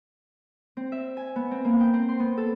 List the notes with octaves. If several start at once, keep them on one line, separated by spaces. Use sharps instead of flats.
C4
E5
G#5
B3
C4
A#3
G5
C4
C6
B3
A4